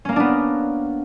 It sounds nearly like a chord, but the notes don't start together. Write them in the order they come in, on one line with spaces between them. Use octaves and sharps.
C#4 A#3 A#4 D4 B3